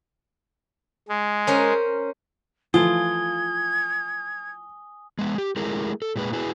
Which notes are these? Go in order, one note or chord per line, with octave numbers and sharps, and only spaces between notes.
G#3
C#4 A#4 C5
E3 F3 A3 F4 G#5 D#6 G#6 G7
G#3 B3
G4
G#3 A3 E4 G#4 A#4
A4
A#2 G#3 B4
E4 F#4 G#4 B4